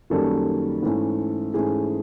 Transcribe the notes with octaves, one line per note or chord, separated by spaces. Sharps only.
F#2 D#3 G3 A#3 C#4 A4
G#2 E3 A3 C#4
G#2 E3 A3 C#4 G#4